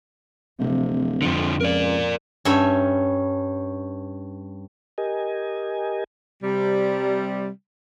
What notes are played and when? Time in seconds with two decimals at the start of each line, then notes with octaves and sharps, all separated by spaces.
0.59 D1 C3 F3
1.22 F2 D3 F3
1.61 C#2 A#4 D5
2.45 G2 C#4 C#5 E5 B5
4.98 G4 A#4 D#5 G#5
6.43 C3 G3